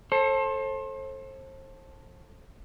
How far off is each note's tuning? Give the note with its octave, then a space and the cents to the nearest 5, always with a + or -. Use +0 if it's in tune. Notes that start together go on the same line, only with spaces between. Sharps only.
A4 +0 C5 +35